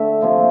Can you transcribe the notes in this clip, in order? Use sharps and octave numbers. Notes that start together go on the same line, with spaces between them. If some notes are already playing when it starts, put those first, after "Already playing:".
Already playing: D3 A3 E5
C3 F3 A#3